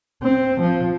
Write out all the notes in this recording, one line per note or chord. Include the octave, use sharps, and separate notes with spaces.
C4
F3